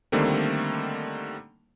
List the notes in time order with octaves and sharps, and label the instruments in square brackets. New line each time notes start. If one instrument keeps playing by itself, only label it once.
[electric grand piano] D3 D#3 G3 A3 A#3 C4